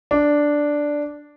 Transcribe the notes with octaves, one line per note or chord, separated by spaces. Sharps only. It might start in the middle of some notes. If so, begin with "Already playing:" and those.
D4